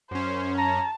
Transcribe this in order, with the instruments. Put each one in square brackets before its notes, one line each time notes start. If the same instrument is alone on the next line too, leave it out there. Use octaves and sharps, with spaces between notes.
[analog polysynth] F#2 C#4 [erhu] C5
[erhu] A5 [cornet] A#5